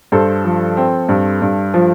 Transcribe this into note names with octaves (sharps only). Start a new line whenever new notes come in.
G2 A4 C5
F3
C4
G2
G2
F3